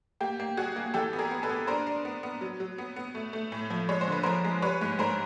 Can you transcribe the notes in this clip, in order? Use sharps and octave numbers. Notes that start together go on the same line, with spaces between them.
A#3 G4
A#3
G3 F#4 G#4
A#3
E3 G4 A4
B3
G#4 A#4
B3
A4 B4
B3
D4 A#4 C5
D4
B3
B3
F#3
F#3
B3
B3
A3
A3
A2
F3
G#3 C#5
C5
D3 B4
F3 A#4 C5
G#3
G3 B4 C#5
G#2
G#2 A#4 C5